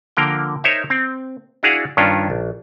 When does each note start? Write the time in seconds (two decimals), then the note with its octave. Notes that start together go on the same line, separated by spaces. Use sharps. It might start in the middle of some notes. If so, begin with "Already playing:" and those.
0.17 D3 F3 A#3 A#4 G5
0.64 D#4 A#4 C5 C#5 E5
0.90 C4
1.63 D4 E4 F#4 G#4 F5 F#5
1.97 G2 D#3 C#4 D4 F4
2.30 A#1